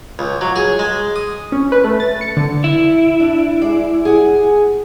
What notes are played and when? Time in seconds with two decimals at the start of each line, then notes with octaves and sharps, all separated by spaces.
0.19 C#2
0.41 F#3
0.56 G#4
0.79 G#3
1.16 D#6
1.52 C#4
1.72 B4
1.84 A3
2.00 A6
2.21 C#7
2.37 D3
2.64 E4
3.20 D4
3.61 G#3 D5
4.05 G#4 F#5 G#5